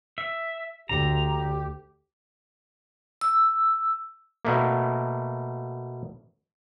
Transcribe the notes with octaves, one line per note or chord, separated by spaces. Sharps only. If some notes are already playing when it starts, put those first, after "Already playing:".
E5
D2 G4 A#5
E6
B2 A3 A#3